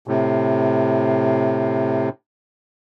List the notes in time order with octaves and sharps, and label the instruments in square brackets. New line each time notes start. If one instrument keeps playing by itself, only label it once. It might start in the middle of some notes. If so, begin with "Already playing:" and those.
[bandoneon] A2 C3